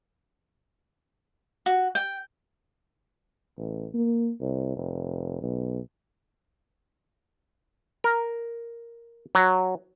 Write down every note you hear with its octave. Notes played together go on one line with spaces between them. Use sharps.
F#4
G5
A1
A#3
C2
F1
B1
A#4
F#3